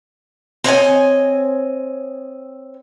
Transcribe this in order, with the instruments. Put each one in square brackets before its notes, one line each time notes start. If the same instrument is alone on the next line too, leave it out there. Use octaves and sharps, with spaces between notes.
[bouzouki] C4 C#5 D#5 G#5